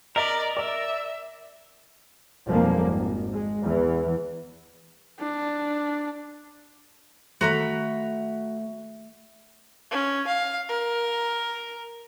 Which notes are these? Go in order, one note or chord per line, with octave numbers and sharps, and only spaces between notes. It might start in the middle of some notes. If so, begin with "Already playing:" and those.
A#4 D5 D#5 A#5 B6
D5 E5
B1 F2 F3 G3 G#3 A#3
G#1
G#3
E2 E3
D4
D#3 A3 F#4 A4 A#5 B5
C#4
F5
A#4